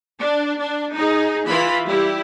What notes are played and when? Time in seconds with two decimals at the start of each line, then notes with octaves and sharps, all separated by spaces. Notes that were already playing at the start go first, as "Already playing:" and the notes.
0.19 D4
0.59 D4
0.95 D#4 G#4
1.47 E3 E4 F4 B5
1.85 G3 E4 G4